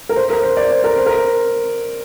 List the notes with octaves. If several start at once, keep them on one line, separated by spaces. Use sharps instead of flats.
A#4
C5
A#4
C5
D5
C5
A#4
C5
A#4